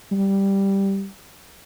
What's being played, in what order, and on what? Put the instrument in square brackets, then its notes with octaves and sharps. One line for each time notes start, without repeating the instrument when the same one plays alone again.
[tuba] G3